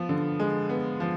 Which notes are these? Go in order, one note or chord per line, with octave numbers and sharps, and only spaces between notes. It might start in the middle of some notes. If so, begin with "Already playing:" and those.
Already playing: F3 B3
D3
G#3
B3
F3